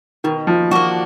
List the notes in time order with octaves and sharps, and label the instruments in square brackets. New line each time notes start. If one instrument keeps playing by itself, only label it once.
[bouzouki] B2 [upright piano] D#3
[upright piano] F3
[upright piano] F3 [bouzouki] A#3 D4 F#4